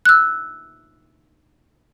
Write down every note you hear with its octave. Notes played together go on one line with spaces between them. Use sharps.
E6 F#6